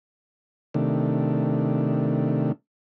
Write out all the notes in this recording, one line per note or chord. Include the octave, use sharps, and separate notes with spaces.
C3 D#3 A3 D4